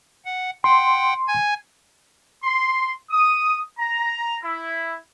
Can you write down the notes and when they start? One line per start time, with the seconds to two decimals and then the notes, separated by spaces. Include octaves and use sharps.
0.25 F#5
0.64 F#5 G5 C6
1.28 G#5 G#6
2.43 C6
3.11 D#6
3.79 A#5
4.43 E4